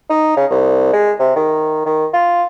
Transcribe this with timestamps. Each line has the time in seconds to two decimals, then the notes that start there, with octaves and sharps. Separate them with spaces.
0.10 D#4
0.37 C#3
0.51 C2
0.93 G#3
1.19 C3
1.36 D#3
1.86 D#3
2.14 F4